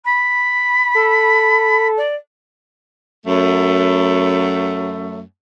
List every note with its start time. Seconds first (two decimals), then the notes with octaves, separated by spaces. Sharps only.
0.05 B5
0.95 A4
1.97 D5
3.25 F#2 A3